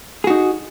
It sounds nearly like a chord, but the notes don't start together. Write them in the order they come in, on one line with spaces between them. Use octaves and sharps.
G#4 F#4 D#4